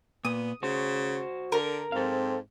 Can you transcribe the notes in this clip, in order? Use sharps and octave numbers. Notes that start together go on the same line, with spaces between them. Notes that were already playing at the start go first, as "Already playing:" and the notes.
A#2 B3 D#6
C#3 F#4 C5
D3 A#4
G#2 C4 A4 F5